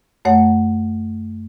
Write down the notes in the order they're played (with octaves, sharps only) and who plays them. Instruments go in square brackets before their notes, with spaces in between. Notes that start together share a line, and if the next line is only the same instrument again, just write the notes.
[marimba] F#2 A3 C#5 F#5